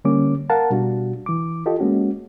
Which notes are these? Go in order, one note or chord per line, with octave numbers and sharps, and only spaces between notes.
D3 G3 A#3 C#4 D6
A#4 F5 F#5 A5
B2 G3 D4 F#4
E3 D6
F4 G4 A4 D#5
G#3 A#3 C#4 F#4